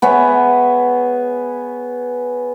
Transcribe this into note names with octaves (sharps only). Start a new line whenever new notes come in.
B3 G#4 C#5 E5